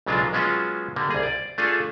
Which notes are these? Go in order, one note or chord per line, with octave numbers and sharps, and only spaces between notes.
B1 C#3 F#3 G#3 D4 F4
F#3 G#3 B3 C#4 F4 F#4
D3 G3 A#3
C2 G#4
D5
A3 D4 F4 G#4 A4